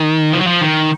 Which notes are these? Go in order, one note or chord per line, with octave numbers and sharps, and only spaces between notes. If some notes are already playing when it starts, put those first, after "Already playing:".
Already playing: D#3
F3
F#3
F3
D#3